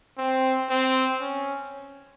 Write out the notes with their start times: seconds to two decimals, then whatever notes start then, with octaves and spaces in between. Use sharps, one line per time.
0.18 C4
0.70 C4
1.21 C#4